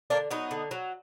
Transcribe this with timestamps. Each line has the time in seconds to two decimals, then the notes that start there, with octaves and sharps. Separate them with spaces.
0.10 D3 A#3 D4
0.31 F#3 B3 D#4
0.51 D3
0.71 F#3